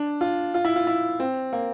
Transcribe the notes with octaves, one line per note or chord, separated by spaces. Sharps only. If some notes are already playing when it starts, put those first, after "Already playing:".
Already playing: D4
F4
F4
E4
F4
E4
C4
A#3